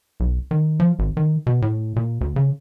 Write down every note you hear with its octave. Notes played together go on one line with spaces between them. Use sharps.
B1
D#3
F3
G#1
D#3
B2
A2
A#2
D2
C#3